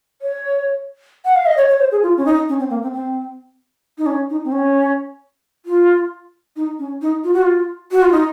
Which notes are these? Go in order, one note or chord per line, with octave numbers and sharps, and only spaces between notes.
C#5
F#5
F5
D#5
C#5
C#5
C5
G#4
F4
C#4
D#4
C#4
C4
A#3
C4
C4
D#4
C#4
D#4
C4
C#4
F4
D#4
C#4
D#4
F4
F#4
F4
F#4
F4
D#4